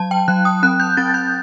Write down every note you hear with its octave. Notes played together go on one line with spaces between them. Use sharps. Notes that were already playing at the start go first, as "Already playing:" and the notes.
Already playing: F#3 A5
G5
F#3 F#6
D#6
C4 F#6
G6
C4 A6
G6